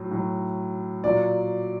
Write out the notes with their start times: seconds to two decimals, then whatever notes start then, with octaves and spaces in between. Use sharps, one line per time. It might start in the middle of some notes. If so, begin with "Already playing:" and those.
Already playing: A2 F#3
0.11 A2 F#3
1.04 A#2 F#3 D5